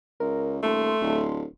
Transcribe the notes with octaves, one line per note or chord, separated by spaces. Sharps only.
C#2 A#4
D#1 A3 C6
D1